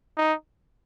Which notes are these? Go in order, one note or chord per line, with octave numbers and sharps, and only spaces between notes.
D#4